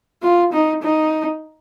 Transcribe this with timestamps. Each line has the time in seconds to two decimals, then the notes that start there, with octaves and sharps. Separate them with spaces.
0.23 F4
0.53 D#4
0.83 D#4